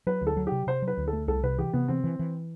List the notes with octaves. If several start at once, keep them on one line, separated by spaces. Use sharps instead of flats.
F#3 B4
D2
A4
F#3
C3 G4
C3 C5
F#3
B4
D2
A4
A3
C2 A4
C3 B4
E3 G4
C3 B3
E3 C4
E3
E3